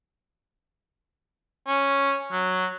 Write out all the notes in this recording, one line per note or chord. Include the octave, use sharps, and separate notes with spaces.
C#4
F#3